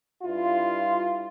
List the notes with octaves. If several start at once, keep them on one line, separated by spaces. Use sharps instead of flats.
G2 E4 F4